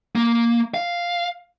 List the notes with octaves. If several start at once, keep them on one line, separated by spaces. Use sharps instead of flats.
A#3
F5